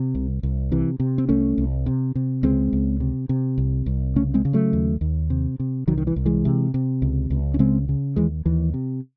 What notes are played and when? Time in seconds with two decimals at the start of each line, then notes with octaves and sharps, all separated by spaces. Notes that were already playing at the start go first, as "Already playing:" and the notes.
Already playing: C3
0.15 C2
0.43 C2
0.72 C3 E3
1.00 C3
1.18 C4
1.29 C2 A3 C#4
1.58 C2
1.86 C3
2.15 C3
2.43 C#2 G#3 C4
2.73 C#2
3.00 C3
3.29 C3
3.58 C2
3.86 C2
4.16 C#3 A3 C#4
4.34 G#3 C4
4.45 C#3
4.53 F#3 A3
4.73 D#2
5.01 D#2
5.30 C3
5.60 C3
5.88 C2 D#3 F#3
5.98 D#3
6.07 E3
6.16 C2
6.26 E3 G#3
6.45 C3
6.74 C3
7.02 C#2
7.30 C#2
7.54 C#4
7.59 C#3 G#3 C4
7.89 C#3
8.16 D#2 E3 G#3
8.46 D#2 E3
8.74 C3